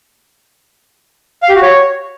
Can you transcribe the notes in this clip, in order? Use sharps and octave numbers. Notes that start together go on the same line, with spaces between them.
F5
G4
F#4
C#5